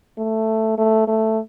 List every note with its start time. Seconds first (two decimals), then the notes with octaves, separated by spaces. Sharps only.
0.18 A3
0.78 A3
1.08 A3